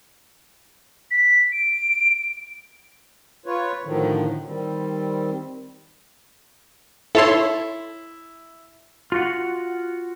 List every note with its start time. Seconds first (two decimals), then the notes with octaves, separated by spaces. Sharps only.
1.11 B6
1.52 D7
3.46 F4 B4 C#5
3.85 A2 D3 D#3 F3 F#3
4.45 D#3 G3 C4
7.15 E4 A4 C#5 C6
9.12 F4 F#4 F#5